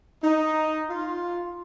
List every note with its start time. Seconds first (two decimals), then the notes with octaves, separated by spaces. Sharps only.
0.23 D#4
0.90 F4